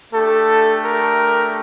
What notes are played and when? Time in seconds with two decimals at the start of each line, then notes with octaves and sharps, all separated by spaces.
0.13 A3 D4 G4 A4
0.82 A#4